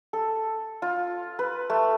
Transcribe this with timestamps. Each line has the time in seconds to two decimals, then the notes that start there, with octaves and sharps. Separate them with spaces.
0.13 A4
0.82 F4
1.39 B4
1.70 A3